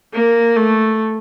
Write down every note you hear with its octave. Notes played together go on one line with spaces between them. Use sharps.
A#3
A3